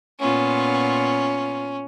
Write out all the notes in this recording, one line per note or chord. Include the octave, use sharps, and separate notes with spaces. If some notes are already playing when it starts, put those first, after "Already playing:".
A#2 B3 C#4 F4